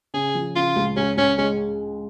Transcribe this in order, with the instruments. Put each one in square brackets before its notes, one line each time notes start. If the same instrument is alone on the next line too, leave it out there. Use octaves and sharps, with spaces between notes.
[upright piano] C#3 [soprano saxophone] G#4
[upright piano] F3
[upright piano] C#3 [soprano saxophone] F4
[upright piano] C#2
[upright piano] C#2 [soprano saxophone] C#4
[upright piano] C#2 [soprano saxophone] C#4
[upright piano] G#3 [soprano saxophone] C#4